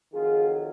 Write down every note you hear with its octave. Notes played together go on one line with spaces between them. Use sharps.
F2 D#3 F#3 F4 G#4